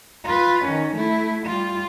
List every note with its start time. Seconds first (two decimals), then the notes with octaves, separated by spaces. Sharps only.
0.24 F4 B4
0.65 D#3 C#4
0.96 A3 E4
1.46 G3 F4